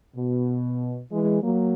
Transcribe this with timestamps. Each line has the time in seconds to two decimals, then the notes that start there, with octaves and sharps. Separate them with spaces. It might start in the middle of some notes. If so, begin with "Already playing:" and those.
0.16 B2
1.12 E3 G#3
1.43 F#3 A#3